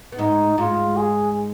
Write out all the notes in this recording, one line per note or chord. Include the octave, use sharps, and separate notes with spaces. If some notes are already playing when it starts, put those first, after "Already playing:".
B3
G#2 G#3 D#4
G#2 G#3 F4
G#4